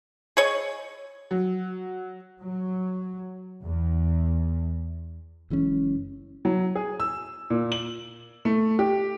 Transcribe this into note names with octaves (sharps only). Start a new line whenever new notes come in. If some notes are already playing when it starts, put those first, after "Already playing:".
G#4 C#5 D#5
F#3
F#3
E2
F#1 E3 G#3 C#4
F#3
G#4
E6
A#2
F#7
A3
G4